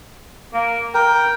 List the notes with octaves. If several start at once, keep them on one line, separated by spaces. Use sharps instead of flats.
A#3
A#4 G5